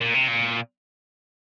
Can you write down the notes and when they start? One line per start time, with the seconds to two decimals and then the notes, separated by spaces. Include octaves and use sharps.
0.01 A#2
0.14 C3
0.28 A#2